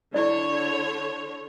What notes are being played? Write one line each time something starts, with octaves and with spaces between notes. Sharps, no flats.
D3 E4 C#5 D5